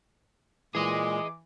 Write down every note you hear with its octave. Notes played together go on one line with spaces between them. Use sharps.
A#2 E3 G#3 G#4 D#5 D6